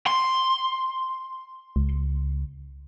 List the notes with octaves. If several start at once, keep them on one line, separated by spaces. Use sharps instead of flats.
C6
C#2